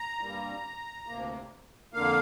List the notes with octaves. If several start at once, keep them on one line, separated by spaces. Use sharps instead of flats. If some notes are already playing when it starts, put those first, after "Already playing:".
Already playing: A#5
G2 G3 A#3
D2 C3 A#3
F2 D3 A#3 F5